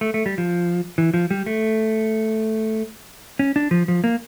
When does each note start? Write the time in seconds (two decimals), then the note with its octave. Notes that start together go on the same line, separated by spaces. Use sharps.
0.01 A3
0.14 A3
0.26 G3
0.38 F3
0.98 E3
1.14 F3
1.31 G3
1.46 A3
3.39 C#4
3.56 D4
3.71 F3
3.88 F3
4.04 A#3